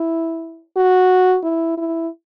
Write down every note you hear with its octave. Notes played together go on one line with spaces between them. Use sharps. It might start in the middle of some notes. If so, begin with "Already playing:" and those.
Already playing: E4
F#4
E4
E4